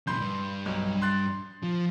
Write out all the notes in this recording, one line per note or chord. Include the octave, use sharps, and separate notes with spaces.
F#2 A#2 B5 C6 G6
G2
B1
C6 F#6 A6
F3